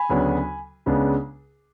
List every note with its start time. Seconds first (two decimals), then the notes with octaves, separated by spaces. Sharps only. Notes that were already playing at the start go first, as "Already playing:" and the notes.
Already playing: G#5 B5
0.09 D2 C#3 F#3 B3 D4
0.86 C#2 C#3 G#3 B3 D4